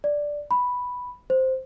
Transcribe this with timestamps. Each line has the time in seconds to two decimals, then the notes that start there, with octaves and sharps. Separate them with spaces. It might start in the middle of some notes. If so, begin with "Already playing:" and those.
0.04 D5
0.51 B5
1.30 C5